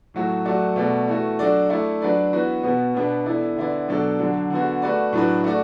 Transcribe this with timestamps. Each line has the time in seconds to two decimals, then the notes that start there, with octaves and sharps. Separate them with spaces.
0.14 A2 F#3 A3 F#4
0.45 F#3 A3 F#4 D5
0.76 B2 A3 F#4 D5
1.08 E3 A3 F#4
1.39 F#3 D4 F#4 A4 D5
1.70 A3 E4 D5
2.02 F#3 D4 B4 D5
2.33 E3 B3 F#4 B4
2.63 B2 B3 F#4
2.95 B2 B3 D4 B4
3.26 E3 B3 E4 A4 D5
3.57 D3 B3 E4 D5
3.88 B2 F#3 D4 A4 D5
4.19 D3 F#3 D4
4.50 D3 B3 F#4
4.82 A3 F#4 B4 D5
5.13 A2 F#3 D4 F#4 B4
5.44 A3 F#4 D5